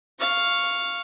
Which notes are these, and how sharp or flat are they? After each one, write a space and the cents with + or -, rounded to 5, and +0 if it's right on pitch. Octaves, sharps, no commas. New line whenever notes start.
F5 +0 C#6 +0